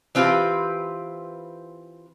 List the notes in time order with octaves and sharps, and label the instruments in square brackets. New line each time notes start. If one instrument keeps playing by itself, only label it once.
[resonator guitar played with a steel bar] E3 C4 F4 G4 B4